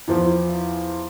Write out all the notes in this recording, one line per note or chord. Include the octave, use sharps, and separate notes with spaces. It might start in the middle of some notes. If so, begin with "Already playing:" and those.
E2 F3